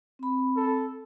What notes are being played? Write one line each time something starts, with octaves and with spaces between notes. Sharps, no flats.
C4 B5
A4